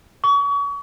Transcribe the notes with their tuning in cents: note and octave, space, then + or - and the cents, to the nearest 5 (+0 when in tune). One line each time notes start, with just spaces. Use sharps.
C#6 +35